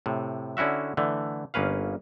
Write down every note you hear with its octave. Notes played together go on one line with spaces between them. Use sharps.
A2 C3
D3 C#4 E4 F#4 E5
D3 E3 A3
G1 A#3 C#4 B4 F5